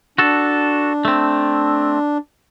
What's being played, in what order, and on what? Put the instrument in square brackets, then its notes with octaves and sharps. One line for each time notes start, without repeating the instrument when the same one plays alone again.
[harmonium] D4 [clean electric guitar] F#4 A4
[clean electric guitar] A3 C4